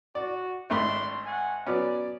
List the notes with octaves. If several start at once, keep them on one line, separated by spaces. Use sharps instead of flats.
F#4 D5
G#1 A3 D4 B5 C6
F#5 G#5
F#3 B3 C#4 D5